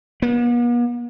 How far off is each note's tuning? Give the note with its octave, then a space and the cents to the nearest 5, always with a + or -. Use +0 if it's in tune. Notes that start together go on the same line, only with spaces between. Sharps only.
B3 -45